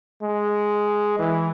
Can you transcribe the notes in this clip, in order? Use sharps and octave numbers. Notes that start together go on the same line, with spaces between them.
G#3
E3